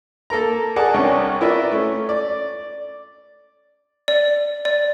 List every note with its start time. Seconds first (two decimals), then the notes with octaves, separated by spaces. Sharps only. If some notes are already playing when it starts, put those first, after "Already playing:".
0.30 A#3 A4 A#4 A#5
0.76 G#4 A#4 D5 F#5 A5
0.94 C2 C#4 D4 A#4 F#5
1.41 E4 F4 A#4 B4 D5 E5
1.72 A3 C#4
2.09 D5
4.08 D5
4.65 D5